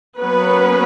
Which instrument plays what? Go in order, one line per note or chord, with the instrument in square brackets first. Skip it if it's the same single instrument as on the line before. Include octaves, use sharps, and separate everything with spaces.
[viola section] F#3 A#3 B3 C#4 B4